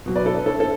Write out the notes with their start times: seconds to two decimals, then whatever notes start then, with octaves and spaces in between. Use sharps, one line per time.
0.06 B2 F#3
0.16 B4 D5
0.26 A4
0.36 B4
0.46 A4 C#5
0.60 A4